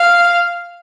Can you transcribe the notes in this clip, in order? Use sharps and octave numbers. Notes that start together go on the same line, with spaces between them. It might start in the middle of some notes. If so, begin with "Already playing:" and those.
Already playing: F5